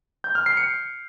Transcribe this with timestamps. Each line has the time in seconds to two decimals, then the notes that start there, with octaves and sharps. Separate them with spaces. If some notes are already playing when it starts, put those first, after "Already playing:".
0.24 G6
0.35 F6
0.46 C7
0.57 C#7